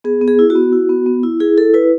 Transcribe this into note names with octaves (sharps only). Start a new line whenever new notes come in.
B3 G#4
B3
G#4
E4
F#4
B3
E4
B3
B3
E4
E4 G#4
E4 A4
E4 B4